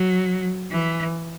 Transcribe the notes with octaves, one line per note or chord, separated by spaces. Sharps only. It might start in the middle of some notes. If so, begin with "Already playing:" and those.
Already playing: F#3
E3